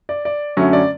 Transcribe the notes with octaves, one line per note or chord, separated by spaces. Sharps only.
D5
D5
F#2 D3 F#3 A3 C#4
D5